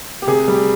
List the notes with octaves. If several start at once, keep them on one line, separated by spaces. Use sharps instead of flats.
G4
C3 G#4
G3